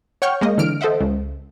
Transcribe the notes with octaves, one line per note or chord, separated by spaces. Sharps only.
C#5 F#5 G5 C#6 F6 G6
G#3 A#3 D#5
D3 E3 F6 D7
A4 C5 D#5 E5 F#5
C#2